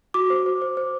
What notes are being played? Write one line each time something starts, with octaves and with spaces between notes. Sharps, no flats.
F#4 D6
C5
C5
C5
C5